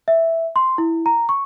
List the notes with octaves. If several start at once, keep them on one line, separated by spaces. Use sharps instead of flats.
E5
C6
E4
A#5
C#6